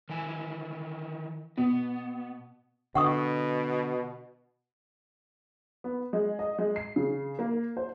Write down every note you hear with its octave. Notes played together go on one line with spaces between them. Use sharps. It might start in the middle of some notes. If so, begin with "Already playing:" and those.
D#3 E3 G#5
B2 B3
B2 D3 F#5 C#6 D#6
B3
G#3
D#5
G#3
C7
C#3
A#3
C5